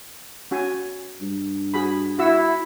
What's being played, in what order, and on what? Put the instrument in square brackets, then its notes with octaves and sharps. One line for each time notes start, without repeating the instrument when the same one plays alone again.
[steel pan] C#4 F#4 G#5
[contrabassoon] G2
[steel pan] F#4 G#4 B5
[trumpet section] E4 [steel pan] F#4 F#5 E6